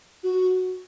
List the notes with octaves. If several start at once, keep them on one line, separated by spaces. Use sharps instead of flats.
F#4